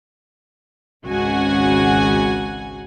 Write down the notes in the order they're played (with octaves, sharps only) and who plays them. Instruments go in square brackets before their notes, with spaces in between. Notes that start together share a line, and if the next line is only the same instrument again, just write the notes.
[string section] G#1 C#2 C#3 F#4 F#5 G#5